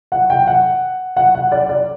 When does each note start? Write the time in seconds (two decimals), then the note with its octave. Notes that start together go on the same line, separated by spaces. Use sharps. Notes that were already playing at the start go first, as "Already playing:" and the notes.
0.12 F#5
0.30 G5
0.47 F#5
1.17 F#5
1.35 F#5
1.52 D5
1.69 D5